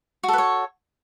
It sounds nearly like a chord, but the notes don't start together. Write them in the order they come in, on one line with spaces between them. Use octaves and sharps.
F#4 A4 B4 C#5